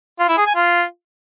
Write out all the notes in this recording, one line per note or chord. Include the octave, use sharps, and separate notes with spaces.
F4
E4
G#4
G#5
F4